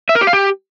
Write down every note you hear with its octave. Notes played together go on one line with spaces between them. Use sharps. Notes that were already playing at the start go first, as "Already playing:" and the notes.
E5
A#4
G4
F5
G4